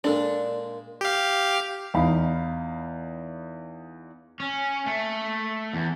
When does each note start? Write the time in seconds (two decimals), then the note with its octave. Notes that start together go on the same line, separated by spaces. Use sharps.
0.04 A#2 G#3 D4 A4
1.01 G4 F5
1.94 E2 D#4 F5 B5
4.40 C#4
4.86 A3
5.73 E2